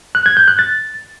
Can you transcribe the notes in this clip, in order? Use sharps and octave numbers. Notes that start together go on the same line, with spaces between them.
F#6
G#6
G6
F#6
A6